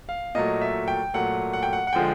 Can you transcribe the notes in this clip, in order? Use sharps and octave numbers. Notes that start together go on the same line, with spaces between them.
F5
A#2 F#3 A3 D#5
E5
G5
A#2 F#3 A3 F#5
F#5
G5
F#5
F#5
D3 F3 G#3 G5